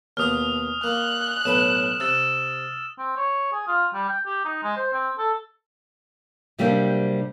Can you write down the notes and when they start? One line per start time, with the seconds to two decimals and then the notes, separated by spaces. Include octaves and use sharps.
0.17 D#2 B2 F#5 D#6 F6
0.84 A#3 F#6
1.45 B1 A2 B4 E7
2.00 C3 E6 A6 E7
2.99 C4
3.17 C#5
3.52 G#4
3.68 F4
3.94 G3
4.09 G5
4.26 G4
4.45 D#4
4.63 G#3
4.77 C5
4.93 C4
5.18 A4
6.58 C3 F#3 G3 A#3 C4 D4